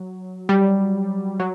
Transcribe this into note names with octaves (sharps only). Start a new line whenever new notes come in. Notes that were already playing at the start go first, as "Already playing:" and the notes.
Already playing: F#3
G3
F#3